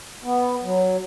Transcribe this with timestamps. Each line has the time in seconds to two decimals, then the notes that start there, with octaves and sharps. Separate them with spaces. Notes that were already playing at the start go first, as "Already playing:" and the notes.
0.24 B3
0.63 F#3